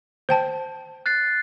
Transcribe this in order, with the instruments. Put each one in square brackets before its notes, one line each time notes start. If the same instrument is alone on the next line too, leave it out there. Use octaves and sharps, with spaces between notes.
[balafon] C5 G5 A5
[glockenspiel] F#6 A6 C7